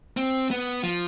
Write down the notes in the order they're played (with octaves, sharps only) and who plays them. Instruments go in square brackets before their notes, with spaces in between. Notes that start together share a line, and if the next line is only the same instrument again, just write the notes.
[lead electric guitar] C4
B3
F3